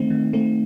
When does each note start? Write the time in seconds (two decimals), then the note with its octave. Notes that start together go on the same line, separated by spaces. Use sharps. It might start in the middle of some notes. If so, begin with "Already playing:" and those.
Already playing: D#3 A3 C4 D#4
0.10 D#3
0.33 A3 C4